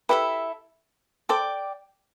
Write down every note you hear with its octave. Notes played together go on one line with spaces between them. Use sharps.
E4 G4 A4 B4 E5
A4 C5 D5 G5 D6